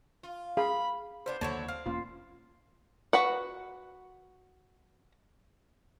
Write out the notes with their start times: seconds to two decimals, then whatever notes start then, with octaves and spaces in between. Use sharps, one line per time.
0.23 F4
0.57 G#4 F5 B5
1.26 B3 D4 E4 C5
1.41 D#2 D3 F#3 A#3 E4 C#5 A5
1.68 C4 F5
1.86 E1 A#3 C#4 F4
3.13 F#4 B4 F#5